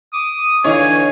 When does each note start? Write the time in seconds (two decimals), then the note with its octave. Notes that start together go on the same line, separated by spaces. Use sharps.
0.13 D6 D#6
0.64 D3 E3 D#4 C#5 F5 G#5